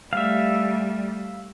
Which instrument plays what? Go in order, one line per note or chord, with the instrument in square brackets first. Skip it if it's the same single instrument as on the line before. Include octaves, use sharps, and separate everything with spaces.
[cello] G3 A3 [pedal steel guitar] E5 F5